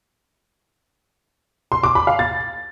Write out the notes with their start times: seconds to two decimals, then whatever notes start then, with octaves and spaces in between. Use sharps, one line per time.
1.72 C6
1.83 D6
1.95 B5
2.07 F5
2.19 A6